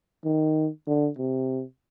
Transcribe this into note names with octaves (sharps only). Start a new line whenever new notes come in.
D#3
D3
C3